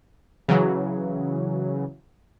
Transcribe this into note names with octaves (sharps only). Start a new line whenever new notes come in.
C#3 E3 F#3